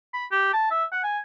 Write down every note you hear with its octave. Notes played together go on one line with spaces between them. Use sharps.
B5
G4
A5
E5
F#5
G#5